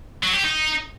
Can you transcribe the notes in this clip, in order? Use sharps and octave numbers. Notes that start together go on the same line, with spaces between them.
F#3
G4
D#4